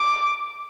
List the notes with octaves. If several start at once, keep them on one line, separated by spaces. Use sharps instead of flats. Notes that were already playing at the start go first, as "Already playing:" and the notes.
Already playing: D6